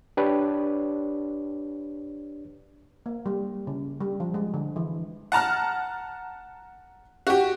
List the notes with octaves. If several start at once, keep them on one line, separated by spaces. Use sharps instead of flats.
D4 G4 B4 C#5 D5
A#3
G3
C#3
G3
F3
G#3
D3
E3
F#5 A5 A#5 F6
F#4 G4